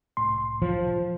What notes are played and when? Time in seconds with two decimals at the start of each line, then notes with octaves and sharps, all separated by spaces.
0.17 C2 A2 C6
0.62 F3